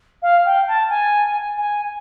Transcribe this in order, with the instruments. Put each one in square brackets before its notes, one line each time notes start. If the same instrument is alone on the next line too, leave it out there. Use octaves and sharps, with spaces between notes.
[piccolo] F5
G5
A5
G#5
G#5